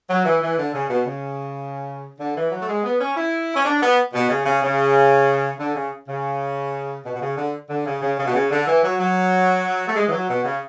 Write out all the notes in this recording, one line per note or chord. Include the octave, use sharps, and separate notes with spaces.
F#3
E3
E3
D3
C#3
B2
C#3
D3
E3
F#3
A3
G#3
B3
C#4
E4
C#4
D4
B3
B2
C#3
C#3
C#3
D3
C#3
C#3
B2
B2
C#3
D3
D3
C#3
C#3
C#3
B2
C#3
D3
E3
F#3
F#3
A3
G#3
E3
F#3
B2
C#3